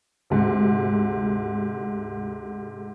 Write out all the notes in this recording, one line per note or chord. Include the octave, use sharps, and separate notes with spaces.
D2 G#2 C3